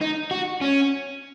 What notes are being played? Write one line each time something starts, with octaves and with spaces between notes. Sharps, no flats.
D#4
F#4
C#4